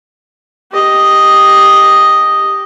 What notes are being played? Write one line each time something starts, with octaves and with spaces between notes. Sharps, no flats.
G4 D#5